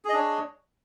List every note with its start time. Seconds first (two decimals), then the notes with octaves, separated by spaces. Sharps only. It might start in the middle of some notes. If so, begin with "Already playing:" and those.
0.05 G#4
0.09 D#5
0.13 D4
0.18 C#5